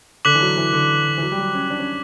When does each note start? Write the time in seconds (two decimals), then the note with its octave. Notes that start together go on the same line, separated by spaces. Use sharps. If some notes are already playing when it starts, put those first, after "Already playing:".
0.25 D3 D6 F#6 B6 F#7
0.35 E3
0.41 F#3
0.57 E3
0.73 D3
1.18 E3
1.21 F#3
1.32 G3
1.38 F#3
1.54 C#4
1.70 D4
1.79 C#4